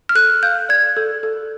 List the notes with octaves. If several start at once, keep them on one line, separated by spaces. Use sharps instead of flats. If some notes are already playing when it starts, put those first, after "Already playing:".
F6
A4 F#6
F5 G6
D5 G#6
A4
A4